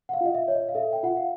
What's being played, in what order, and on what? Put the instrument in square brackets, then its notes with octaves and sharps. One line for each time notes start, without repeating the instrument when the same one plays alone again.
[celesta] F#5
F5
F4 D#5
E5
C#5
D#5
F5
A4 E5
G5
F4 F#5
F5